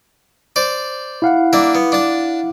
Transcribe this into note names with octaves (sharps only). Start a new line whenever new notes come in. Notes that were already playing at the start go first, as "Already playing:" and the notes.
C5 D5
E4 F5 F#5
A#3 D4 E5
B3
D4 A5